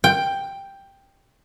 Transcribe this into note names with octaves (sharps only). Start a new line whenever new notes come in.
G5